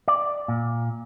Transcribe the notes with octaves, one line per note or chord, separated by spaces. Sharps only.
D5
A#2